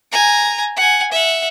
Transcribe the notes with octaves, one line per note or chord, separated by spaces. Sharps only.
G#5 A#5
F#5 G#5
E5 F#5